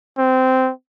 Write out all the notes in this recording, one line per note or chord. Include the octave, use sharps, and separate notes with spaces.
C4